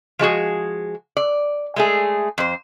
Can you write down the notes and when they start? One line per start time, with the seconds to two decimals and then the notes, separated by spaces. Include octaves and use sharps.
0.19 F3 G#3 F#4 G#4
1.17 D5
1.76 G#3 A3 G#4
2.38 F2 C5